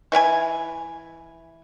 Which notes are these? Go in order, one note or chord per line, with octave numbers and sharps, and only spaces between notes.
E3 E5 F5 G#5